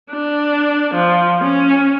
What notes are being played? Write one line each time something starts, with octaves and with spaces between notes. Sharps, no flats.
D4
F3
C#4